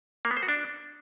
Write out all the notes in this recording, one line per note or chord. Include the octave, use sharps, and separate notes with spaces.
A#3
B3
C5
F#4
D4